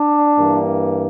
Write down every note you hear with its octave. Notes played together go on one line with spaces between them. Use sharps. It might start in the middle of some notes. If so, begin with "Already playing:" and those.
Already playing: D4
G2 E3 A#3